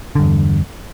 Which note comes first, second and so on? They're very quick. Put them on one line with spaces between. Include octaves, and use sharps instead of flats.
D3 G2 E2